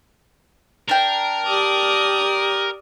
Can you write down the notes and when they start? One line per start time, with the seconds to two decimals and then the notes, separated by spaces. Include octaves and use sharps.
0.89 D4 A#4 G5
1.47 G4 D5 D#6